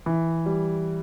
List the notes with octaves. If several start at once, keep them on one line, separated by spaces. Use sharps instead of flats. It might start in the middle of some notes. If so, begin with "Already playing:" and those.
E3
G3